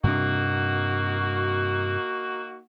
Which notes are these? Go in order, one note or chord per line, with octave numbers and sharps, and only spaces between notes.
G2 C3 A#3 D4 D#4 F#4